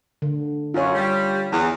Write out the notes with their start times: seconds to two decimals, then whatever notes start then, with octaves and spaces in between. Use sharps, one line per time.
0.22 D3
0.74 F#2 F4 C#5
0.94 G3
1.52 E2